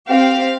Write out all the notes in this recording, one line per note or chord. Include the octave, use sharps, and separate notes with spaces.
C4 G4 F5